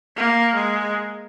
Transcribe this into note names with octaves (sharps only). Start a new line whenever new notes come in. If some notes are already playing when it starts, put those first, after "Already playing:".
A#3
G#3